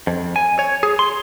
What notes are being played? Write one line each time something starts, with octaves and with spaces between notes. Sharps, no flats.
F2
G#5
C#5
G#4
C6